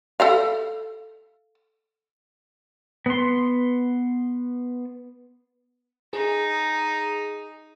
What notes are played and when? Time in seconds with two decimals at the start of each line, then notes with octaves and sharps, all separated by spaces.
0.20 A4 E5 F5
3.06 B3 C6
6.13 D#4 G#4